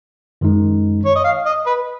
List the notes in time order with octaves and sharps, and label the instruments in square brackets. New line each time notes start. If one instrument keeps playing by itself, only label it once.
[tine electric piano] F#2 D#3 G#3 D#4
[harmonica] C#5
D#5
F5
D#5
B4